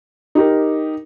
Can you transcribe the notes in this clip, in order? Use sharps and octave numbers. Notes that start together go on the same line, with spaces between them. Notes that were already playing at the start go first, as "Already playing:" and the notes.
D#4 G4 A#4